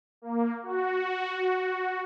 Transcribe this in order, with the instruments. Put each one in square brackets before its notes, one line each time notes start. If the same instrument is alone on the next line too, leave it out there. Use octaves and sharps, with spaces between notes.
[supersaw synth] A#3
F#4